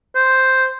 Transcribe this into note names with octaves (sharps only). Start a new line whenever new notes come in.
C5